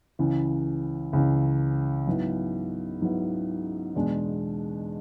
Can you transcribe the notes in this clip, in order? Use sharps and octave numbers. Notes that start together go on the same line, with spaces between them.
C#2 C#3 E3
C#2 C#3 E3
G#2 F#3 B3 E4
G#2 F#3 B3 E4
E2 B2 G#3 D4